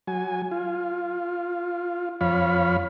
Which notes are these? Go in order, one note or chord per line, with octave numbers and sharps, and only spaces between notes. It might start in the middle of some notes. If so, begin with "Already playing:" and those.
F#3 G#5
F4
F2 F3 C#5 F5 B5